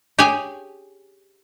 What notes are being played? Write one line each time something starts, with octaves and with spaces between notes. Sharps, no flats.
G4 G#4 C#5 G5 G#5